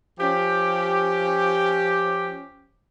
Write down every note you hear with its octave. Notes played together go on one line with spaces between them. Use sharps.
F3 C#4 G4